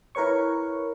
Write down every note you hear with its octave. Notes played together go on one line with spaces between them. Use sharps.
E4 A#4 B4 C#5 C#6